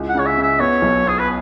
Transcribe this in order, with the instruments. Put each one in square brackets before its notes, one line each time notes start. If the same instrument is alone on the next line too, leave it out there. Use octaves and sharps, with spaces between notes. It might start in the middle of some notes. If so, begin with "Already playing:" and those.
Already playing: [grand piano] C#2 E4
[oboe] F#5
[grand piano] C#3 [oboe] C#5
[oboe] E5
[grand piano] C#3
[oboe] E5
[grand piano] B3 [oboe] C#5
[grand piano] B1
[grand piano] B3 [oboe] G#4
[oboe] B4